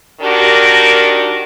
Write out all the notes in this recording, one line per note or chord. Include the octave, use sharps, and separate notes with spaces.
D#3 D4 F#4 G4 A#4